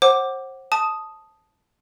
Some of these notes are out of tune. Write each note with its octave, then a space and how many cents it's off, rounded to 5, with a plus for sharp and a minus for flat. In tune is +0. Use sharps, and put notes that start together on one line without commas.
C5 +35 F#5 +15 D6 +0
A5 -5 D#6 +0